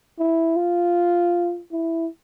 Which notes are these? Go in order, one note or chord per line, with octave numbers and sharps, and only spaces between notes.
E4
F4
E4